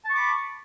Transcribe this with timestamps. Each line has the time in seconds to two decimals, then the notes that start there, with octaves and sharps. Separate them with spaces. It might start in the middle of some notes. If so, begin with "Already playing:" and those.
0.05 A5
0.09 C#6
0.13 D6
0.17 B5